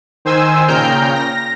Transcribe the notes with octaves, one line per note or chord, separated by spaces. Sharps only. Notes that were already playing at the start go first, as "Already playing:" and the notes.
D#3 C5 G#5 E6
A#2 C#3 G5 A#5 F6 G6
A#6